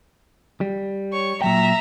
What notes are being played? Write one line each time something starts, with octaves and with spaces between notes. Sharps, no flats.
G3
C#5 C#6
A#2 F#3 E5 G5 A#5